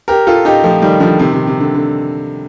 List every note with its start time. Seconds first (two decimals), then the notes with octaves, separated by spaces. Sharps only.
0.08 G4 A#4
0.27 F4 A4
0.45 D#4 G4
0.64 F3 A3
0.82 D#3 G3
1.00 D3 F3
1.19 C3 D#3
1.33 C3
1.47 C3
1.60 D3
1.74 D3